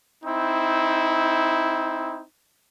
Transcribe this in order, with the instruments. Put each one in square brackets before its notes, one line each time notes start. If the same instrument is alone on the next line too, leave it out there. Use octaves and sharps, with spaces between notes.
[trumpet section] C4 D#4 E4